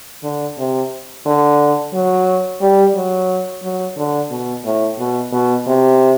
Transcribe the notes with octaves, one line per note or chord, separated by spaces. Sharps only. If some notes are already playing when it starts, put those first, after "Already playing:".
D3
C3
D3
F#3
G3
F#3
F#3
D3
B2
A2
B2
B2
C3